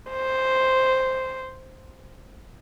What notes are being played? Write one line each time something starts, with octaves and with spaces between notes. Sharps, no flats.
C5